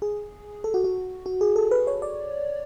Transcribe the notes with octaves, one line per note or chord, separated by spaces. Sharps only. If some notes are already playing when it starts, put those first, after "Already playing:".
G#4
A4
F#4
F#4
F#4
G#4
A4
B4
C#5
D5